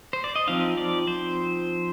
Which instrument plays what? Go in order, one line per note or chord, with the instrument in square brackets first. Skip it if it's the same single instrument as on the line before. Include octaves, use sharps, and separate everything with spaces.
[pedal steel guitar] C5
D5
D#5
F3 C4 D#4 F5
D5
C5